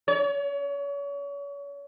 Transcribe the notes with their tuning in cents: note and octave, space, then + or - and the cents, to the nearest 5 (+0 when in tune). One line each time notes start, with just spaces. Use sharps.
C#5 +35